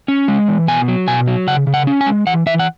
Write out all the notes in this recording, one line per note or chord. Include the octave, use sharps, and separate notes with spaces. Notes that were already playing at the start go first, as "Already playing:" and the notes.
C#4
G#3
E3
B2 G#5
F#3
B2 G#5
F#3
C#3 F#5
C#3
F#5
C#4
G#5
G#3
E3 F#5
E3 E5
F#5